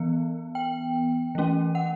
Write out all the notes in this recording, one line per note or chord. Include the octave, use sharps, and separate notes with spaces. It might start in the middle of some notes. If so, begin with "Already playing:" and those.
Already playing: E3 B3
G5
E3 A3 C#4
F#5